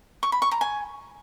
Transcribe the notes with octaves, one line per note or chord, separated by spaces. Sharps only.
C#6
B5
C#6
A#5
G#5